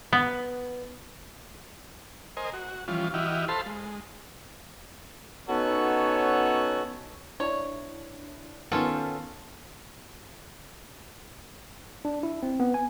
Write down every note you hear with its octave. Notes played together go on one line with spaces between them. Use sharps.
B3
A#4 C5 D#5 G#5
F#4
E3 F3 G3 C#4 F4
E3 E4 F#4 G4 D#5 F6
A4 C5 F5 A5 B5 C6
G#3
B3 C#4 D#4 F#4 A4 C#5
D4 E4 C#5
D#3 B3 C#4 F4 A4
D4
E4
C4
B3
G#5